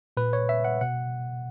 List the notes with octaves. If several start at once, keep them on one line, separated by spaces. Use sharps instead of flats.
A#2 B4
C#5
E5
F#5
B2 F#5